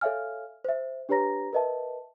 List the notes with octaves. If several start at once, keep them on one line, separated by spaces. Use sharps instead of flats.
A4 C#5 E5 F5 G#5 F6
C5 E5
D4 G4 B4 C#5 A#5 A#6
A#4 B4 D#5 E5 A5